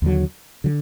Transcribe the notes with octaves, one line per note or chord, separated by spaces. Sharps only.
D#2 D3 F#3
D3 F#3